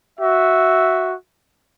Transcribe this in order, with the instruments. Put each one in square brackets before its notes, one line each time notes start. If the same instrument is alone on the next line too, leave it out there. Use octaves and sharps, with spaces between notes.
[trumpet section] F#4 E5